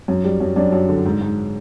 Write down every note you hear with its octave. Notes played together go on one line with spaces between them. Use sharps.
F#2
G3
F#2
F#2 D4
F#2
D3
G#2
G#2